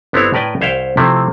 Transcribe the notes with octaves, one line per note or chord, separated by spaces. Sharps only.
G1 B3 C4 D4 E4 C#5
A2 A#4 B4 D5 G5 G#5
C2 C5 C#5 E5 F5 G5
C3 F3 A3 C4 E4